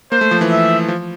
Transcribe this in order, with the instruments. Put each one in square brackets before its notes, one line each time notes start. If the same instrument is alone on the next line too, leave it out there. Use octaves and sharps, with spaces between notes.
[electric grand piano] A#3 [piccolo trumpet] C5
[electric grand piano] A3
F3
E3
[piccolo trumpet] E5
[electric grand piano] F3